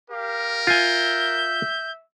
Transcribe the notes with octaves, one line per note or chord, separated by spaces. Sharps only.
G4 A#4 F5
F4 E5 G#5 G6